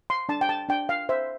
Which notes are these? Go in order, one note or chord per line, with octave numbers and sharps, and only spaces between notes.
C6
D4 A5
G5
A5
D4 G5
F5
C5 E5